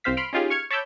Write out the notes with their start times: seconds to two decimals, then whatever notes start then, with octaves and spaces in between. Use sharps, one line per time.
0.04 C2 C4 C5 F5 B6
0.17 B5 C6 F6 D7
0.33 C#4 D#4 F4 G4 G#4
0.50 C#6 F6 G#6 C#7
0.70 C#5 A5 B5 D6 E6 G6